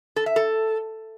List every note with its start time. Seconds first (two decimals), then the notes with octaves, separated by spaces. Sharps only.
0.16 A4
0.26 E5
0.36 A4